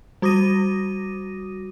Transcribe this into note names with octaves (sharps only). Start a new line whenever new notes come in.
G3 F#4 D6 D#6 A#6 D#7